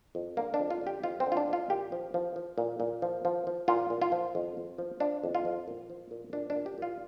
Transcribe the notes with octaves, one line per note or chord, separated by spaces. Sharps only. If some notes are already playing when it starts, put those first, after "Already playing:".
F2
D3 A#3
D4
F2
F4
D3
G4
F2 F4
C4
D3
F4
D4
F2
F4
A#2 G4
F3
F3
F3
A#2
A#2
F3
F3
F3
A#2 F4
A#2
F4
F3
F2
F2
F3
F3 D4
F2
F4
F2
A#2
F3
A#2
A#2 D4
D4
A#2
G4
A#2 F4